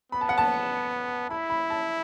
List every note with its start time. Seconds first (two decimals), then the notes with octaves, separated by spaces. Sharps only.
0.12 B3 B5
0.21 A5
0.29 F#5
0.38 A5
1.30 E4 B5
1.50 B5
1.70 A5